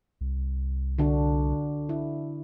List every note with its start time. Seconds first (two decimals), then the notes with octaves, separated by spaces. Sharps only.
0.21 C2
0.98 D3 D4 F#4
1.89 E4